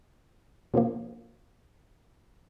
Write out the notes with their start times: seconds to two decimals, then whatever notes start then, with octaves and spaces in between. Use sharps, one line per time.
0.74 B2 D3 F3 A#3